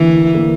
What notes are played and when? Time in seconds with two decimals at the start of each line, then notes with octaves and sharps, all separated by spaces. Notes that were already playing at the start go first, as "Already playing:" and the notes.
Already playing: D2 D3 E3 A#3
0.34 D3 A#3